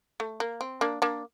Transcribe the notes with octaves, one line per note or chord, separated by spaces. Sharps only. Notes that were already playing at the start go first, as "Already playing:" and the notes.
A3
A#3
C4
A#3 D4
A#3 D4